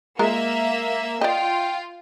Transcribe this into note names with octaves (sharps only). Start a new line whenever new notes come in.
G#3 A#3 F4 A#4 E5
F4 D5 D#5 G5